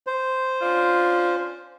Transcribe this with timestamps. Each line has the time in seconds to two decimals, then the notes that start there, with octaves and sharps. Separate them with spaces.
0.07 C5
0.61 C#4 D4 F4